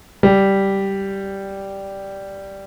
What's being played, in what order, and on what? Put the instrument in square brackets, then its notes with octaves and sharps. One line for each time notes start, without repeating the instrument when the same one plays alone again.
[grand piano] G3